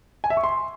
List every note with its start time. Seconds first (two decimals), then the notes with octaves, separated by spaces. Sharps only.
0.24 G#5
0.30 E5
0.37 C#6
0.44 C6